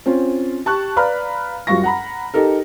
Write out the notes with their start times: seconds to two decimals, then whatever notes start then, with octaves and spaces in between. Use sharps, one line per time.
0.06 C4 C#4 F4
0.66 G4 A5 C#6 F#6
0.96 B4 D5 F5 A#5 B5 F6
1.67 F#2 F3 G3 F5 C#6 A#6
1.84 F#5 A#5 B5
2.34 D#4 G4 A4 A#4